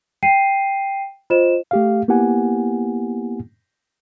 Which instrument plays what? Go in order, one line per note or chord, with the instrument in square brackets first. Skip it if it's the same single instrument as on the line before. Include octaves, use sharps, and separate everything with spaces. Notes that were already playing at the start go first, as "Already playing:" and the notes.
[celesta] G5 C7 D#7
F4 C5 D#5 E7
[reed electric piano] A3 G4 F5
A#3 B3 E4 G4 F#5 G#5